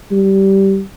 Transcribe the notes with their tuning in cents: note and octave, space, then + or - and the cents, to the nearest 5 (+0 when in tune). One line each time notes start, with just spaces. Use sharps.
G3 -15